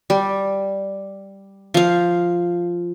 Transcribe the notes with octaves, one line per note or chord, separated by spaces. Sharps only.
G3
F3 F5